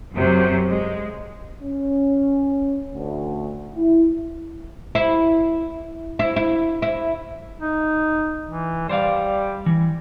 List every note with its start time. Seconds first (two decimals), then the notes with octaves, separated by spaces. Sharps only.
0.13 F#2 C3 F#3
0.70 G#3
1.62 C#4
2.94 D2
3.75 E4
4.95 E4
6.19 E4
6.36 E4
6.82 E4
7.60 D#4
8.48 E3
8.89 G3 C5 D5 F5
9.66 E3